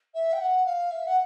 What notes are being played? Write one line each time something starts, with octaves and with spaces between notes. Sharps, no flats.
E5
G5
F#5
F5
E5
F#5